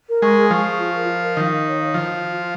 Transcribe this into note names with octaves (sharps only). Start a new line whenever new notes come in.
A#4
G#3 C#6
G#4
F3 C#6
G#4
F4
A#4
D#5
A#4
D#3 F5
F5
C#5
F5
F3 F4
F4
F4
F4